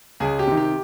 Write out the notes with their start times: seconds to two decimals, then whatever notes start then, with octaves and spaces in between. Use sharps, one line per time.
0.20 C#2 G#4
0.39 G4
0.47 C3 D#3
0.57 G4